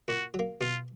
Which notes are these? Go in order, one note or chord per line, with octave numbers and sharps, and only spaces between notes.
A#2 F#4
F#3
A#3
B2 F4